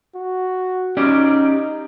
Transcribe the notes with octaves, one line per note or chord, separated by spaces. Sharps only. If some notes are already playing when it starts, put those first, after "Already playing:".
F#4
C#4 D#4 G4 D5